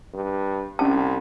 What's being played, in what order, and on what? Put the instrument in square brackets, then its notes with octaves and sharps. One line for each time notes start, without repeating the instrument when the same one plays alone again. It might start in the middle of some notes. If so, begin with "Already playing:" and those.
[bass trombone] G2
[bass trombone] C2 [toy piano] C#4 A5